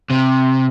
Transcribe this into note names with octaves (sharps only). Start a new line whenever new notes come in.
C3